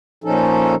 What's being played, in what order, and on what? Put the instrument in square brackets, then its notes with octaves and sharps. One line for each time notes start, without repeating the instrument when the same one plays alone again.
[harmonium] A#2 F3 C#4 D#4 A4